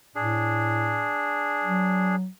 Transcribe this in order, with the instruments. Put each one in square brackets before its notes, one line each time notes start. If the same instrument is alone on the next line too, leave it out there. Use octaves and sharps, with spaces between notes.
[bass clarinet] A2 [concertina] D4 G#4
[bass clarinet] F#3